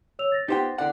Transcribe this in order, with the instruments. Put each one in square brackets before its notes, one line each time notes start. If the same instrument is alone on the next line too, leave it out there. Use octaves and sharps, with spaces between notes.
[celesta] C#5 E6 F7
A6 A#6
[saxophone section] B3 F4 G4 [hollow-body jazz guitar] D#4 C5 G5
[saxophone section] E2 D3 D5 [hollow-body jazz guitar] F#5